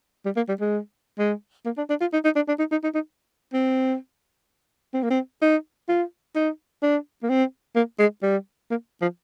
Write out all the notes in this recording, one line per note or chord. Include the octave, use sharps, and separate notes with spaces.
G3
A#3
G3
G#3
G#3
A#3
D4
D4
F4
D#4
D#4
D4
D4
D#4
D#4
D#4
D#4
C4
C4
A#3
C4
D#4
F4
D#4
D4
A#3
C4
A#3
G#3
G3
A#3
F3